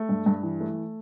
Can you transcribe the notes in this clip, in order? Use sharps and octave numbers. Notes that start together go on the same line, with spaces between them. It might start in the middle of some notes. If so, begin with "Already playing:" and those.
Already playing: A3
G2
G2
E3
A3